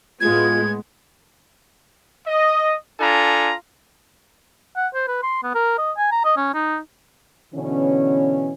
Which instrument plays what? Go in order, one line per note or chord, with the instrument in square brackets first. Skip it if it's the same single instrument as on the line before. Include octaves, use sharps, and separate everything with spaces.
[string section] A2 G#3 B3 [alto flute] F4 [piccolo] G#6
[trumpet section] D#5
D4 F4 A4 G#5 A#5
[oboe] F#5
C5
B4
C6
B3
A#4
D#5
G#5
A#5
D#5
C#4
D#4
[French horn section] B2 D3 E3 C#4